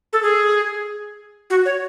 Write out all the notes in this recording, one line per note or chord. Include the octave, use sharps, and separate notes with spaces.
A4
G#4
F#4
C#5